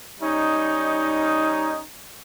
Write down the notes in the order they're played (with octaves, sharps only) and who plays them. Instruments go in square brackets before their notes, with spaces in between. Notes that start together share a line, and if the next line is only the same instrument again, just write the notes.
[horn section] G3 C#4 D#4